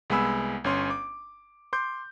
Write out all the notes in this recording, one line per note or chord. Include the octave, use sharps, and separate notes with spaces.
C2 G#3 B3 G#5 B5 E6
G1 C#4 C6
D6
C6 D6 G6